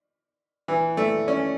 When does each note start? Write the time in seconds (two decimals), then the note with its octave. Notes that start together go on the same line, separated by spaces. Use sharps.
0.68 E3
0.97 A3
1.28 C#4